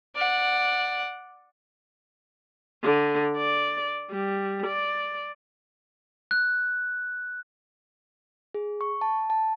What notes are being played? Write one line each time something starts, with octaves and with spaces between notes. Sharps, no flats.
D5 F#5
D3
D5
G3
D5
F#6
G#4
C#6
A5
A5